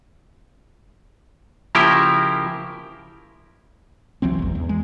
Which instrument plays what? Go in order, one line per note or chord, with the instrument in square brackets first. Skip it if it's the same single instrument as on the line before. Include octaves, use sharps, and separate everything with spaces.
[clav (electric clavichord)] C#3 F3 A#3 E4 G4 A#4
[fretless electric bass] C2 E3 F#3 C4
G#1 E2
E2
G#3